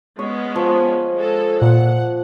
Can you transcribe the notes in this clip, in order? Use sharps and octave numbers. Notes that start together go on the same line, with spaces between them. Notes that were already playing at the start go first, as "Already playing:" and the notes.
G#3 B3 C#4 C#5
F3
G#3 A4
A#2 F#5